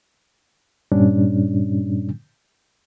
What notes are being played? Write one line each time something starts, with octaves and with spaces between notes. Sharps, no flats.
G2 A#2 G3 C#4 D4